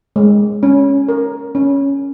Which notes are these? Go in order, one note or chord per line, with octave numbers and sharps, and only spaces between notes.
G#3
C#4
A#4
C#4